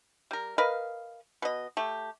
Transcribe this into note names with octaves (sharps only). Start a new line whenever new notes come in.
G3 A#4
A#4 B4 D#5 F5
B2 D#5
A3 G4